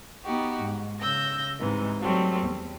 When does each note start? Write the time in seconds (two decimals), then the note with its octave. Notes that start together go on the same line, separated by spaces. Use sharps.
0.25 B3 D#4 F#4 G4
0.61 G#2
1.00 C#3 E6 G6 A#6
1.59 G#2 C3 E3 D#4
2.00 F#3 G3 A3 C4
2.43 E2